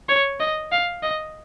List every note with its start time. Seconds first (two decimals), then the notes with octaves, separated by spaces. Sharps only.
0.09 C#5
0.40 D#5
0.72 F5
1.03 D#5